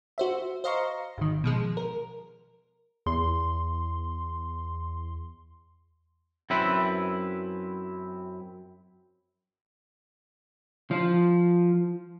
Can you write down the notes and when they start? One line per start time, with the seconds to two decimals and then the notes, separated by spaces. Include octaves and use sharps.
0.18 F#4 C5 E5
0.64 C5 D#5 F5 A#5 C6 C#6
1.18 G#1 D#3
1.44 B2 F3 G#3
1.77 A#4
3.06 E2 C6
6.50 F#2 C4 E4 B4
10.91 F3